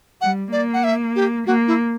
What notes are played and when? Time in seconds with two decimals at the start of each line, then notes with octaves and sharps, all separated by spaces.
0.21 G3 F#5
0.52 A#3 D5
0.74 F#5
0.84 E5
1.16 G4
1.47 A#3 F#4
1.68 E4